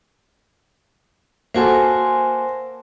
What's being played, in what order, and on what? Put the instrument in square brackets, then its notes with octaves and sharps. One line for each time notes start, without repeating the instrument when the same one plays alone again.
[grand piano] A#3 F#4 A4 [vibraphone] C5 G#5 C6